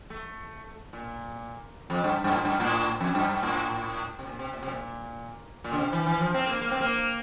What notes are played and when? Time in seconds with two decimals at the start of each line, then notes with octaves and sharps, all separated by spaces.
0.10 A3
0.93 A#2
1.90 F2
2.04 G2
2.24 G2
2.31 A2
2.45 G2
2.60 A2
3.01 F2
3.15 G2
3.29 G2
3.43 A2
4.19 C3
4.26 A#2
4.39 C3
4.53 A#2
4.62 C3
4.68 A#2
5.64 A#2
5.72 D3
5.78 C3
5.93 E3
6.06 E3
6.20 F3
6.34 C4
6.47 A#3
6.61 A#3
6.71 C4
6.81 A#3